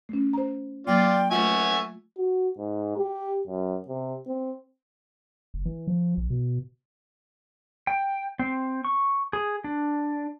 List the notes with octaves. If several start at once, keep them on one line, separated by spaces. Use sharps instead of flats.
A3 C#4
C5 A#5
F#3 A#3 F4 D5 G5
A3 F4 E5 F#5 G#5 C#6
F#4
G#2
G4
F#2
C3
C4
F#1
E3
F3
A#1
B2
G5
C4
C#6
G#4
D4